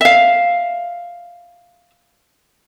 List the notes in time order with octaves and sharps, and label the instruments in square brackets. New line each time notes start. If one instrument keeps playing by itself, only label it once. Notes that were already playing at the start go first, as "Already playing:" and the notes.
[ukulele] E5 F5